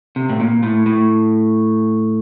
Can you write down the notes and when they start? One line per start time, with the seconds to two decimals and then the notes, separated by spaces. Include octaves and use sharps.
0.16 C3
0.30 A2
0.40 A#2
0.63 A2
0.86 A2